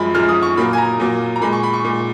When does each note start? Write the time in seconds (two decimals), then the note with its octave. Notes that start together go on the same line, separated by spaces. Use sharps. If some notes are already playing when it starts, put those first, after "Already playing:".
Already playing: F#2 F3 G#3 B5
0.14 F#2 F3 G#3 F6
0.29 D#6
0.42 C#6
0.57 A#2 F#3 A#3 B5
0.73 G#5
0.78 A#5
1.00 A#2 F#3 A#3
1.36 A#5
1.41 A#2 G#3 B5
1.53 C#6
1.63 B5
1.73 C#6
1.84 A#2 G#3